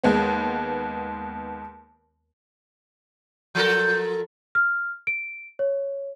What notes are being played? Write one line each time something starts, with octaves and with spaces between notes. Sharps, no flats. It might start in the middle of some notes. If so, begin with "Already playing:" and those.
D#2 G#3 B3
F3 A4 A#4 G6
F6
D7
C#5